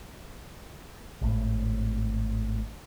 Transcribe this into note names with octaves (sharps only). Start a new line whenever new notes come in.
G#1 A2